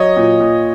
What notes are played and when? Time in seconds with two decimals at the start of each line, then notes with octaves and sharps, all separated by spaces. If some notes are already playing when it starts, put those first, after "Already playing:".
Already playing: F#3 C#5 D#5
0.16 A#2
0.40 A#2